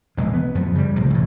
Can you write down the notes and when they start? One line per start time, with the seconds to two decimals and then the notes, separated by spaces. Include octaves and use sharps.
0.17 E1 A#1 G#3
0.34 B3
0.55 F#2 F3 B3
0.75 C#3 G3
0.96 C2 A2 C3 F3
1.10 A1 A2